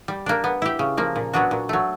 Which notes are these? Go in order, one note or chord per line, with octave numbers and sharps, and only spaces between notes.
G3
A#3 D4
B3
E4 G4
C#3
F3 A#3
A#2
F#3 B3 D4 F#4
A#2
F#3 A3